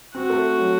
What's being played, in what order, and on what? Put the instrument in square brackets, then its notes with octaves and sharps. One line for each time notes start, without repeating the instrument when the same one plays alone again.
[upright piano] C4 [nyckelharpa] F#4
[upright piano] A3
F#3